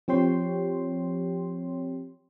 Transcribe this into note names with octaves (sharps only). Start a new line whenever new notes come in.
F3 C4 G4 C#5 G5 C6